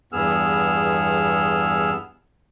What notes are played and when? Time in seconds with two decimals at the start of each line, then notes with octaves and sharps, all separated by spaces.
0.12 E2 G2 B3 G#4 E6 F6